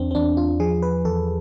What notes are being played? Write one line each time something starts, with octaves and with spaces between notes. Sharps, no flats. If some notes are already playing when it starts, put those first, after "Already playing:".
Already playing: E2 C4 D4
C4
E2 D4
F4
F3 G#4
B4
E2 A4